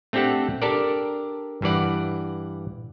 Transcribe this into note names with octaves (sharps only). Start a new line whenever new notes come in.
A3 C4 D4 G4 A4 F#5
D4 G4 A4 A#4 D5
G2 E3 D5 F#5